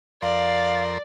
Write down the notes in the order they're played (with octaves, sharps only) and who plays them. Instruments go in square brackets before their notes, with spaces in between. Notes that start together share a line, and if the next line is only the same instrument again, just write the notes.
[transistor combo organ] F2 A#4 C6 [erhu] D5 [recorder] F5